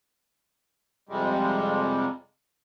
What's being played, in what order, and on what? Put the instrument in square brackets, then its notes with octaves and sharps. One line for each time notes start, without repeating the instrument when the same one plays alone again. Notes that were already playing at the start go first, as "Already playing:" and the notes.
[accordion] F2 C3 G3 G#3